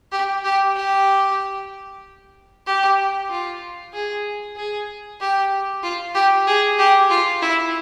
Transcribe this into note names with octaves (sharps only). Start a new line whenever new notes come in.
G4
G4
G4
G4
F4
G#4
G#4
G4
F4
G4
G#4
G4
F4
E4